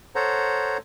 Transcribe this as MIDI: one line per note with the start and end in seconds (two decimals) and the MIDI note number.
0.15 0.78 69
0.15 0.78 72
0.15 0.78 73
0.15 0.78 78
0.15 0.78 82